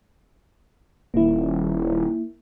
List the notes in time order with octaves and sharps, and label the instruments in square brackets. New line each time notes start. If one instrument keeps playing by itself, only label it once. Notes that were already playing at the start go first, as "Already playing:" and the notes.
[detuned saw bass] D#1 [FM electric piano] A#3 E4